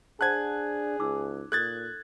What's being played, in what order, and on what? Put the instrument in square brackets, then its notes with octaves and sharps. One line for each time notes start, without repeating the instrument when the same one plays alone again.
[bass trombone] D4 [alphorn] G#4 [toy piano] C5 F#5 A5 [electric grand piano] F#6 G#6
[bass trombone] C#2 [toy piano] D#4 D6 E6
[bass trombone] A#2 [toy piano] A4 [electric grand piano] F#6 G#6 A6